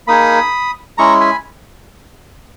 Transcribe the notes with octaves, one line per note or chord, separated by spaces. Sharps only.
A#3 D#4 G#4 B5 D#6
G#3 C#4 E4 A#5 C#6
G#5 B5